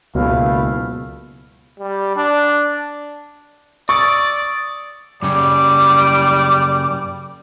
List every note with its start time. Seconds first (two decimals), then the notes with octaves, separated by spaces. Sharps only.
0.15 F#1 C#2 B2 A3 E4 F5
1.79 G3
2.17 D4
3.89 D5 C#6 D#6 E6 A6
5.22 F#2 C#3 G3 D6